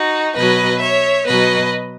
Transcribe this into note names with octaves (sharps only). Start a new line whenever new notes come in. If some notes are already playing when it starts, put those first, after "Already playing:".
Already playing: D#4 F#4
B2 F#3 B4 D#5
C#5 E5
B2 F#3 B4 D#5